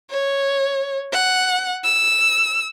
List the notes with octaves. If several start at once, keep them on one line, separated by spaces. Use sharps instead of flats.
C#5
F#5
E6